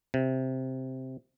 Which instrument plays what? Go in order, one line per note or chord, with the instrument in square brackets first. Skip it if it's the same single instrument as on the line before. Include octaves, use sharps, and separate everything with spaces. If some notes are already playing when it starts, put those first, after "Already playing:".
[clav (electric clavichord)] C3